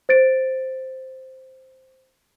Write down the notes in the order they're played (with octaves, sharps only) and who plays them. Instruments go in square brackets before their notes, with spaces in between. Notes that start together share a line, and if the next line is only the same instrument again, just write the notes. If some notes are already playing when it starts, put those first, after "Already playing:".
[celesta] C5 A6 D7